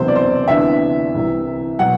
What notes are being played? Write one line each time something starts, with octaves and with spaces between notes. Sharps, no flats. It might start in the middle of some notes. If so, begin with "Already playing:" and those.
Already playing: E1 E2 C3 F#3 B3 C5
D5
C5
D2 C3 E3 B3 D4 E5
C2 C3 E3
B2 F#3 F#5